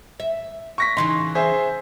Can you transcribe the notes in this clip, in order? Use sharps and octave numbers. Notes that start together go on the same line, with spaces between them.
E5
C#6 A#6 B6
C#3 E3 D#4 C6
G#4 C5 E5